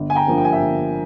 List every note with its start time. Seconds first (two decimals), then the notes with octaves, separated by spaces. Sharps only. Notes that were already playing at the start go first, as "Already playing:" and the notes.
Already playing: G1
0.10 G#5
0.15 G5 A#5
0.27 G2 F3 A#3
0.38 G5
0.45 G#5
0.53 E5 G5
0.60 G1